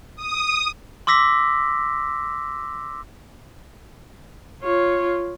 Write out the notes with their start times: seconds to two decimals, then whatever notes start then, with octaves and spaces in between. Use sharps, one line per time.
0.16 D#6
1.07 C6 D6 E6 A#6 B6
4.63 F4 C#5